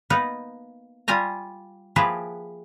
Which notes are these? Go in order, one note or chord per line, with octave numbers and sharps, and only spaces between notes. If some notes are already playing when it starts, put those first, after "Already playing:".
A#3 B3 D#4 A#4 B4
G3 F4 G4 G#5 A#5
F3 A#3 E4 G4 G#4 B4